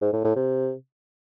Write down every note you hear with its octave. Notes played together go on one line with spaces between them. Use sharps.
G#2
A2
A2
C3